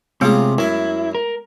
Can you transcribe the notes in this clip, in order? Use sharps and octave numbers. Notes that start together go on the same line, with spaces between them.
C3 G#3 A3 B3 C#4 F4 G#4
F#2 E4 G#5
A#4